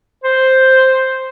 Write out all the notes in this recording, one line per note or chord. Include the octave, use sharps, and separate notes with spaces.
C5